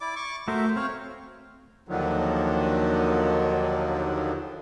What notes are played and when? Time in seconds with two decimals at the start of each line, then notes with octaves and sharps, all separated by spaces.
0.01 E4 D5 D6
0.16 C#6 D6
0.48 A3 F#4 A#4 C5 E5
0.76 C4 C#5 F5
1.89 D#2 D3 D#3 F3 F#3